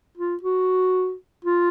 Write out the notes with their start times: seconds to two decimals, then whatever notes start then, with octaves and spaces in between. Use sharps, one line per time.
0.17 F4
0.43 F#4
1.44 F4